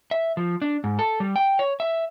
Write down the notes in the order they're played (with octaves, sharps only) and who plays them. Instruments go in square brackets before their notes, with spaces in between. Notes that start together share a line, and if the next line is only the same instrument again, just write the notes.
[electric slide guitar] E5
F3
D4
G#2
A4
G3
G5
C#5
E5